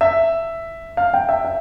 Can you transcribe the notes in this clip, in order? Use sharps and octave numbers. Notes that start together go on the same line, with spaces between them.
E5
F5
G5
E5
E5